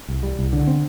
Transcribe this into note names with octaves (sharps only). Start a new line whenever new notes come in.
C2
G3
C2
D3
C4